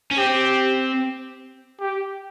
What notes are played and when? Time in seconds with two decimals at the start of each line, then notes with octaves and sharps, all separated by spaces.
0.11 C#4
0.18 C4 G4
1.81 G4